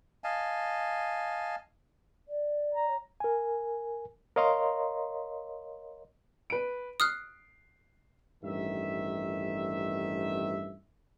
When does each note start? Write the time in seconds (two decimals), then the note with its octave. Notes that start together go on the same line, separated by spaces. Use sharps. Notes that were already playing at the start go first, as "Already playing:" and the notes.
0.24 D#5 F5 G#5 A5
2.28 D5
2.75 A#5
2.88 C#5
3.20 A#4 G#5
4.36 A#4 C#5 D#5 F5 A#5 C6
6.50 B4 D7
7.00 D#6 F6 F#6 C7
8.44 A1 G2 D#3 E5